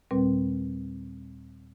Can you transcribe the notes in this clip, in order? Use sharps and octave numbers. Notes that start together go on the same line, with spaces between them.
D#2 A#2 G3 C4 B4